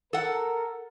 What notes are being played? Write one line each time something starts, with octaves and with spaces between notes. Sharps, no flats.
A4 A#4 F#5